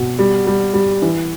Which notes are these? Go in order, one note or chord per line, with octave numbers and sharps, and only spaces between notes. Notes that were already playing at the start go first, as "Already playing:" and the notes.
Already playing: B2
G3
G3
G3
E3